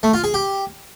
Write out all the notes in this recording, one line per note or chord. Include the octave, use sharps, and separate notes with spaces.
A3
F4
G#4
G4